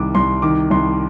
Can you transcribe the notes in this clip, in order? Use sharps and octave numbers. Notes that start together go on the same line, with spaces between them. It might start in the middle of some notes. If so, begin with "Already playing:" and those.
Already playing: C2 D#3 D6
C2 C6
D#3 D6
C2 C6